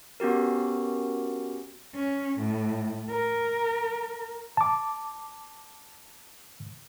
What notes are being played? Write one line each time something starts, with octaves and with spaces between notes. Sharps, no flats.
B3 C#4 F#4 G4 A#4
C#4
A2
A#4
A5 D6